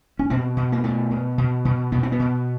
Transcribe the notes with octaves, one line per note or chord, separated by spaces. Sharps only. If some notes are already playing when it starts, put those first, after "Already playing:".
C#4
B2 C4
B2
A#3
B2 A3
B2
B2
B2
B2 B3
C4
B3
B2